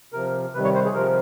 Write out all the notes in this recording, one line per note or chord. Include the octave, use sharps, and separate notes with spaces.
C3 F3 A#4
C3 D#3 G3 B4
C#5
C5
G#4
C3 F3 A#4